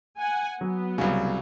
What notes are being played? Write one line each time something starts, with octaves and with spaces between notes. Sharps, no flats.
F#5 G#5
F#3 B3
C2 C#3